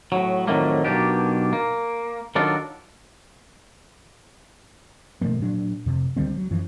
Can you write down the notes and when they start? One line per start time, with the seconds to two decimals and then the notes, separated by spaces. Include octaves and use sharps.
0.12 A2 F#3
0.47 F2 A2 D#3 F#3 A3 A#3
0.84 B1 B2 A#3 D4 G4
1.53 A#3
2.35 D#3 F#3 D4 F4 A4 A#4
5.21 B2 F3 A3 A#3
5.40 A#2 F#3 D4
5.86 F2 C3
6.16 C#2 D3 G3 C4
6.36 F#3
6.51 F#2 E3 F3